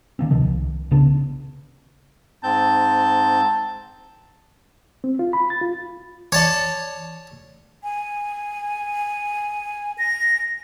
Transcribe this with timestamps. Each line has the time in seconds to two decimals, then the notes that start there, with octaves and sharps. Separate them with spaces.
0.19 D#3 A#3 C4
0.31 D1 C3 D#3 F3
0.44 C2
0.91 A#1 C#3 B3 D4
2.43 G#2 C4 A5 G6
5.04 C4
5.19 F4
5.33 B5
5.50 A6
5.61 F4
6.32 E3 C#5 D5 A5
7.83 G#5
9.98 A#6